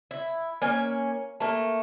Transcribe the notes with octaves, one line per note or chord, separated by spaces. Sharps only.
E4
A#3 C#4 G#5
A3 A#3